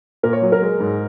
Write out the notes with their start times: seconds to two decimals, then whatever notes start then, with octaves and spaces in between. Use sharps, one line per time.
0.23 A#2 A#4
0.33 C#5
0.42 F#3
0.52 A#4
0.62 G#3
0.80 G#2